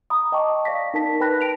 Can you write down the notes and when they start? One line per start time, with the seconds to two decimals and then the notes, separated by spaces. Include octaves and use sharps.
0.10 A#5 B5 D#6
0.32 D#5 G5 A5 C#6 D6
0.65 D5 F5 A#6 B6
0.94 D#4 A#4 A5 B6
1.20 B4 G5 B5 F#6 A#6
1.41 A5 D7 F7